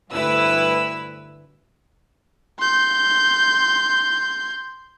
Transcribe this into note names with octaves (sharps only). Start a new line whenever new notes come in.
D2 G2 E4 B4 E6
C6 G6